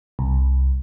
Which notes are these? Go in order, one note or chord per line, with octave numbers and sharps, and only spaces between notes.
C2